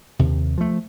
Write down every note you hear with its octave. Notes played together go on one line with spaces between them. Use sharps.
D#2 C3
F3 A3